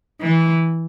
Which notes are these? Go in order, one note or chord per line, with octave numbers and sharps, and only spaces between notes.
E3